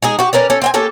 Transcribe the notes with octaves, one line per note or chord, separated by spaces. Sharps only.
G#3 D#4 G#4
F#4 G4
C#4 A#4 B4 D5
C#4 A4
C4 G5 G#5
A#3 C#4 G4 A4